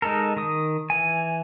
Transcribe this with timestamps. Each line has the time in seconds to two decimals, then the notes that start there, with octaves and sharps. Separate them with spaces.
0.02 G#3 D#4 A4 A#4
0.36 D#3 D#6
0.90 E3 G#5